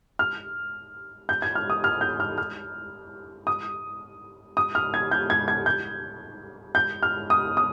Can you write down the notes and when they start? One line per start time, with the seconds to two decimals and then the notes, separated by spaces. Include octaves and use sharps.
0.19 F6
1.29 G6
1.42 G#6
1.55 F6
1.70 D#6
1.84 F6
2.01 G6
2.20 F6
2.38 F6
3.47 D#6
4.57 D#6
4.75 F6
4.94 G#6
5.11 G6
5.30 G#6
5.48 G#6
5.66 G6
6.75 G6
7.03 F6
7.30 D#6
7.57 D#6